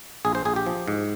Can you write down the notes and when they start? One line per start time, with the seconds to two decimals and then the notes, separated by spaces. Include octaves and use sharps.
0.25 A#1 G#4
0.35 C5
0.45 A#1 G#4
0.56 G4
0.66 F3
0.88 G#2